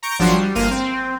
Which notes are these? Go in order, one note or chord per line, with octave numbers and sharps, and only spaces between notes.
A#5 C#6 G6 D7
G#1 F3 F#3 D4 F#4 C6
G3
G1 A#3 F5 F6 D#7
C4